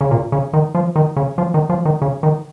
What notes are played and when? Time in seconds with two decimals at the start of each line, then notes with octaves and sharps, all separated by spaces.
0.01 C#3
0.11 A#2
0.32 C#3
0.53 D#3
0.75 F3
0.96 D#3
1.16 C#3
1.38 F3
1.54 D#3
1.69 F3
1.85 D#3
2.02 C#3
2.23 D#3